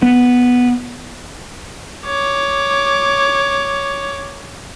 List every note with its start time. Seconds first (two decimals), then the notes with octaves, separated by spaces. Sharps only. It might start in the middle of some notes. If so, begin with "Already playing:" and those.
0.02 B3
2.06 C#5 D6